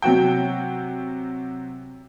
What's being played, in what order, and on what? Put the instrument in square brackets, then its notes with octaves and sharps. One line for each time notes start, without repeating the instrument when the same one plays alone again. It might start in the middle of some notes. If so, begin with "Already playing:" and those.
[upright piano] C3 F#3 F#4 G5